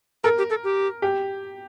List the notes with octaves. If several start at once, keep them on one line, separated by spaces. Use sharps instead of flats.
A4 A#4
G4
A4
G4
G4